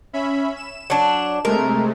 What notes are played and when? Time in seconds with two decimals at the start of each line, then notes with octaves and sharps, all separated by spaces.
0.13 C#4 E5 B5
0.56 E7
0.90 F#3 D4
1.45 C3 G#3 A3 A#4